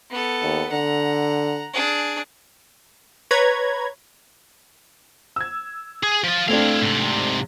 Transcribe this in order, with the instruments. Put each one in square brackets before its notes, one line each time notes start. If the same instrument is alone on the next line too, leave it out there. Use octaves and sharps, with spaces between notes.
[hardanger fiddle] B3 A4
[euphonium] D#2
[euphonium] D3 [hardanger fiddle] F#5 A#5
[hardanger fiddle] D4 G#4
[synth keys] B4 C#5 A#5 B5 G#6
[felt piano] E6 G#6
[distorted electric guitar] G#4
F3 F4
[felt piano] A3 C4 D4 [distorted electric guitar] E4 F5
[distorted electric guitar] G#2 C3